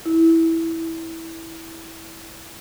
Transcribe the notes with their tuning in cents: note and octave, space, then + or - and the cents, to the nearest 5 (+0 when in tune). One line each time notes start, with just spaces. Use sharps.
E4 -10